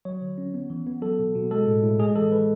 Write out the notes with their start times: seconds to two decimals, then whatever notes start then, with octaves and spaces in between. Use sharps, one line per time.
0.05 F#3 C#5
0.22 D3
0.38 C#4
0.54 B3
0.70 E3
0.87 B3
1.02 F#3 A4
1.19 B2
1.35 B2
1.51 G#3 A4
1.67 A2
1.83 A2
1.99 G#3 G#4
2.16 E3 A4
2.31 E3 B4